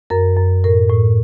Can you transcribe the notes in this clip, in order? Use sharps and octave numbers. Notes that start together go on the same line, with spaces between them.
F#2 A#4
F#2
A2 A#4
A2